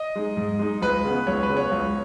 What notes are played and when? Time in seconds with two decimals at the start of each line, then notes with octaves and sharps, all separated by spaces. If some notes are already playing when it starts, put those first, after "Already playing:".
Already playing: D#5
0.15 G#3 D#4
0.37 G#2
0.59 G#3 D#4
0.82 C#2 B4
1.05 C#3 B3
1.27 C#2 C#5
1.43 B4
1.49 C#3 B3
1.57 C#5
1.72 C#2